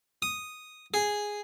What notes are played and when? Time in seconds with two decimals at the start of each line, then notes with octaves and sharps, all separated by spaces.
0.22 D#6
0.94 G#4